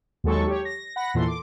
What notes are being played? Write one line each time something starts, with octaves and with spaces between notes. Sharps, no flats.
D#2 F#3 G#3 A4 A5 C#6
G4 C#5
A#6
F#5 B5 A#6
E2 A#2 E3 A4 C6
D6